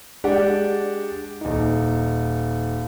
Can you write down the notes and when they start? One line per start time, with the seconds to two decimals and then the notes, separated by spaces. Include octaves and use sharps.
0.24 G#3 D4 G4 D5 F#5 G5
1.41 D#1 D#4